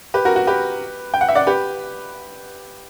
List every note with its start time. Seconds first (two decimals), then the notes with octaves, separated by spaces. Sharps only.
0.14 G4 B4
0.25 F#4 A#4
0.36 F#4
0.47 G4 B4
1.14 G5
1.21 F#5
1.29 E5
1.35 D5 F#5
1.47 G4 B4